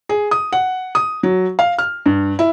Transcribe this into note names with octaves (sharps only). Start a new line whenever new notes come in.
G#4
D#6
F#5
D#6
F#3
F5
F6
G2
E4